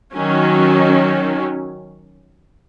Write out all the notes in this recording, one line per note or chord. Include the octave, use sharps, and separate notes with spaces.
D#3 F#3 C#4